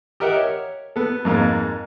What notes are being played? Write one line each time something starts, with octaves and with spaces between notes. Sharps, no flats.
G4 A#4 D#5 E5 F#5
C#5
B3 A4
F2 G#2 A#3